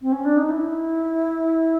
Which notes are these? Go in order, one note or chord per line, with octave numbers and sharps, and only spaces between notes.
C4
C#4
D4
D#4
E4